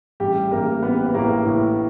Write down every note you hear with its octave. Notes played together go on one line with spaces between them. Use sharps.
A1 G3 G4
A1 A#3 A#4
A1 B3 B4
B4
A2 A#3 A#4
A2